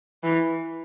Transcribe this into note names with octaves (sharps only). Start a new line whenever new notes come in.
E3